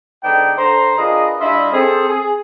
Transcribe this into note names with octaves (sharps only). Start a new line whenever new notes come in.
G#2 D3 B3 D4 D#4 G5
D3 C5 A#5
D4 F4 G#4 A#4 B4 D#5
G3 D4 E4 F4 D#5 E5
C4 G#4 A4
G#4